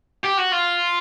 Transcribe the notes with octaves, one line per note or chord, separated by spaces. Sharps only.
G4
F#4
F4